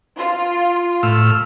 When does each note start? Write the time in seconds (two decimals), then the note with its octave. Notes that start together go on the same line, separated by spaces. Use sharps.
0.19 F4
1.03 A2 E6 F6